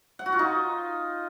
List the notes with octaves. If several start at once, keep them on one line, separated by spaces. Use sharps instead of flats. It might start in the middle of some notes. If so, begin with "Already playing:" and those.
F#5
F#4
F4
D#4